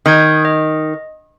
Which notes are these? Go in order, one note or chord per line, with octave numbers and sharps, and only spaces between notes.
D#3 D#6 G6 G#6
D#5